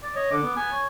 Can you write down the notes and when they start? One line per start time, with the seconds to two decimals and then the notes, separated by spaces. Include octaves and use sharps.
0.03 D5
0.15 C#5 D#5
0.31 D3 D6
0.43 B3
0.57 B3 G#5
0.72 C#5